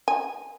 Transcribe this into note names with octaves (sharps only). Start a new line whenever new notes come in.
G#5